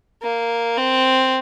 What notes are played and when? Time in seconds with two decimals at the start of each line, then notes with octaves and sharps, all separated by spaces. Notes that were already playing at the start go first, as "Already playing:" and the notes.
0.23 A#3
0.77 C4